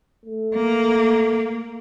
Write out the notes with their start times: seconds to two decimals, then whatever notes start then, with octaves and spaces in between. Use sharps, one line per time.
0.26 A3
0.55 A#3